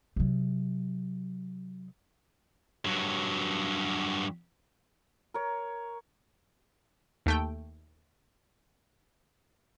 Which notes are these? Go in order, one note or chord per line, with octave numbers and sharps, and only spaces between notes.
C3 F#3
G2 F#3
A#4 C#5
D#2 A3 G5